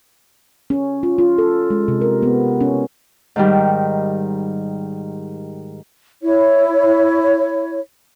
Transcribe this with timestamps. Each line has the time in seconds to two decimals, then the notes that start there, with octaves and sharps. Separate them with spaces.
0.70 C#4
1.03 F4
1.18 F4
1.38 A4
1.70 G#3
1.88 C3
2.01 A#4
2.23 B3
2.61 C#4
3.36 G#2 D#3 G3
6.23 E4 C#5